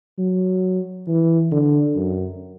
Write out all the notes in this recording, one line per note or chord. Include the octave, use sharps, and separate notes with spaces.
F#3
E3
D3
F#2